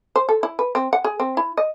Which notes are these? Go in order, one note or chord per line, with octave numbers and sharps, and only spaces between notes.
C5
A4
E4
B4
C4
F#5
G#4
C4
E4
D#5